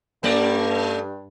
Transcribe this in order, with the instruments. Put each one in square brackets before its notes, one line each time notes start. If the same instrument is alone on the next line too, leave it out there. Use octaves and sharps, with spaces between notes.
[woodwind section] G2 [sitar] G3 A3 D5